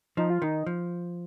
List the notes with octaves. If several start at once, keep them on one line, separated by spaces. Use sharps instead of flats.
F3 D#4
F4
D#3 D#4
F3